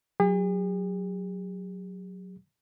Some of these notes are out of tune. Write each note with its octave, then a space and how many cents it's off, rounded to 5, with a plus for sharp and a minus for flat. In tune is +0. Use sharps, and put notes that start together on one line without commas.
F#3 +0 G#4 -45